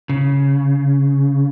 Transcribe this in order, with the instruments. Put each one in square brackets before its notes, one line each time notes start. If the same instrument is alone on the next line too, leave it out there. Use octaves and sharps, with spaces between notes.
[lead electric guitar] C#3